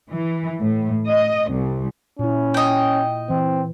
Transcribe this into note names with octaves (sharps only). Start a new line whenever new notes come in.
E3
A2
D#5
C2
A#2 C#4 E4
D#5 G5
E3 C4